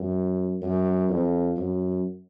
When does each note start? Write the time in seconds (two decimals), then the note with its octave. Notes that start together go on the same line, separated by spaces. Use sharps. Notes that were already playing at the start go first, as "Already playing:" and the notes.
Already playing: F#2
0.62 F#2
1.09 F2
1.57 F#2